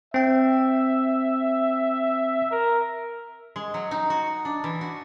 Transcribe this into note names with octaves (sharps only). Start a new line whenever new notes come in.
C4 E5 G5
A#4
G#3
F#3
D#4
F#4
D4
E3
F#4